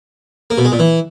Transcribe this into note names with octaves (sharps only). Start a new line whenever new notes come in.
A#3
B2
G#3
A#2
E3